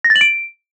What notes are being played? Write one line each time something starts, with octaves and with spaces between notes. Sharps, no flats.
A#6
A6
F#7
D7